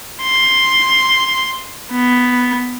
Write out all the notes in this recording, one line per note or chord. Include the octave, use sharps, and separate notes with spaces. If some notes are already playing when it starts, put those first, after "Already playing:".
C6
B3